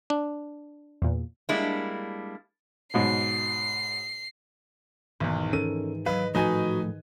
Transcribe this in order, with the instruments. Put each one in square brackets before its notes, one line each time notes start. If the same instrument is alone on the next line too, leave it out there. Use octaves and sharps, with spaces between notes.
[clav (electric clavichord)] D4
[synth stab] E2 A#2
[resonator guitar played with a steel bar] G3 G#3 A#3 D4 E4
[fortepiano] G#2 B2 F#3 [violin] C7
[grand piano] B1 E2 [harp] G#2 D#3 E3
[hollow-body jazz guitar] C#4 A4 A#4 [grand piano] D#7
[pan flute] F#3 [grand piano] B4 [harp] D#5 [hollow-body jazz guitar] F5
[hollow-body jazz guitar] A2 F3 [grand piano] D#4 B4 G#5 [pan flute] F#4